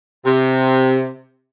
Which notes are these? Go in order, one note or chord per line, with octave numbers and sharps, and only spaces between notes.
C3